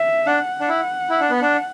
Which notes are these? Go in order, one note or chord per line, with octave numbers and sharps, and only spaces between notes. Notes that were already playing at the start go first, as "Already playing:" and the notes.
Already playing: E5
D4 F#5
D4
E4
E4
D4
B3
D4